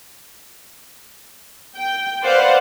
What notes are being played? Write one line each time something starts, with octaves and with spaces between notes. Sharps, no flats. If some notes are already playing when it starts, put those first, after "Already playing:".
G5
B4 C5 D5 F5 F#5